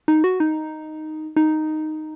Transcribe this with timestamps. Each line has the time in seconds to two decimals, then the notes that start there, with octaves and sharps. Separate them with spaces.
0.08 D#4
0.24 F#4
0.40 D#4
1.36 D#4